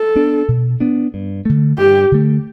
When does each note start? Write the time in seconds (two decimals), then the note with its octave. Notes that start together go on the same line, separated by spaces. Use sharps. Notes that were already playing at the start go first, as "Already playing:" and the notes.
Already playing: A4
0.15 B3 D4
0.48 B2
0.80 B3 D4
1.14 G2
1.45 D3 A3
1.78 G2 G4
2.12 D3 A3